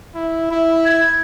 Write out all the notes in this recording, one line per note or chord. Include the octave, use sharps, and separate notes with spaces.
E4
E4
G#6